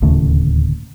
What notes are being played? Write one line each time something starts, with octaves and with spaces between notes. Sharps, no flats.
D1 D#2 C#3 A3